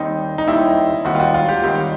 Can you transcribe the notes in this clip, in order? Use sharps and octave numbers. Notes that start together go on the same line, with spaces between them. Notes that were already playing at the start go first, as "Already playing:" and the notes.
Already playing: D#2 D#3 G3 C4 D#4
D#4
D#2 D#3 G3 C4 E4
D#2 D#3 G3 C4 F#4
F4
F#4
F4
G4
D#2 D#3 G3 C4 G4